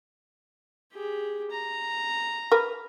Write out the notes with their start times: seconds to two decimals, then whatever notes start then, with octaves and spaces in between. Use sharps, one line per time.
0.93 G4 G#4
1.51 A#5
2.52 A#4 B4